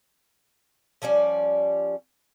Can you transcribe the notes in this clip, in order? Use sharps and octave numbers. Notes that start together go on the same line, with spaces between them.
F3 G3 C#4 D5